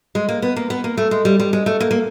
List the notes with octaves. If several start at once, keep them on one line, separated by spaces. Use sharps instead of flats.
G#3
A#3
B3
A#3
B3
A#3
A3
G#3
G3
G3
G#3
A3
A#3
A#3